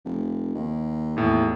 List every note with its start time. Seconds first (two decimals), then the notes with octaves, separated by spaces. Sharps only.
0.05 F1
0.55 D#2
1.17 E2 A2